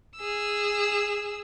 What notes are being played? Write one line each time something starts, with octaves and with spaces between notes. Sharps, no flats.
G#4 E6